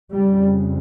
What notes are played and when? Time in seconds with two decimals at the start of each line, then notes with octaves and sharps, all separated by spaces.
0.13 F2 C#3 G3